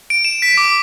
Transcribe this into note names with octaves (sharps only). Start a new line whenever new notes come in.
D7
E7
B6
D6